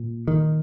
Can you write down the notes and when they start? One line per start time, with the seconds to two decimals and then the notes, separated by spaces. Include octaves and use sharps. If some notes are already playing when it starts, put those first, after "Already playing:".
Already playing: A#2
0.27 D#3